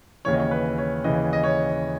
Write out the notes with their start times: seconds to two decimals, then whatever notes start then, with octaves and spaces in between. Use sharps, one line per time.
0.25 D#2 C#3 E3 C#5
0.34 D#5
0.40 C#5
0.51 B4
0.78 C#5
1.04 D#2 C#3 E3 D#5
1.33 D#5
1.44 C#5